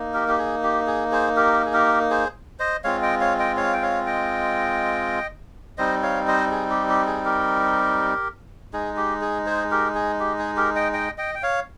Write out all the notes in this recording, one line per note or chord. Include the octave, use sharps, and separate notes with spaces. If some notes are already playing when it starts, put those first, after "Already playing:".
Already playing: A#3 D#4
G4 A#4
G4
G#4
G4
G#4
G#4 C5
G4 A#4
G#4
G4 A#4
G#4 C5
C5 D#5
G#3 C4 F4 C#5 F5
D#5 G5
C#5 F5
D#5 G5
C#5 F5
G5
C#5 F5
D#5 G5
G3 C4 D#4 C5 D#5
C#5 F5
C5 D#5
G#4
G4
G4
G#4
G4 A#4
G#3 D#4 G#4
G4
G#4
G#4 C5
G4 A#4
G#4
G4
G#4
G4 A#4
D#5 G5
D#5 G5
D#5 G5
G5
C#5 F5